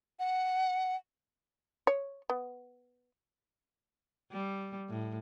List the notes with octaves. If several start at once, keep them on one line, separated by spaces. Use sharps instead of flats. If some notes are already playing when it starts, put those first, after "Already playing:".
F#5
C#5
B3
G3
A2